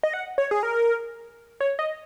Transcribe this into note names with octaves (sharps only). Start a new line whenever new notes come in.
D#5
F#5
C#5
G#4
A#4
C#5
D#5